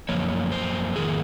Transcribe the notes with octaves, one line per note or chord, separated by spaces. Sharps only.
F#2 F3 A#3 C#5
C5
F2 D#3 A#3 G#4